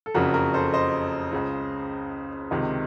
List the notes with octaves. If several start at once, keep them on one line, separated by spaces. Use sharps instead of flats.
A4
F#1 F2 C#3 F#4 A#4
F#4 A#4
A4 C5
C5 D#5
C#2 C#3
C#2 C3 D#3